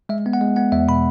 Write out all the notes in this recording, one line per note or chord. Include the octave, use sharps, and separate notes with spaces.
G#3 E5
B3
F#5
G#3
B3 F#5
E2 E5
B2 B5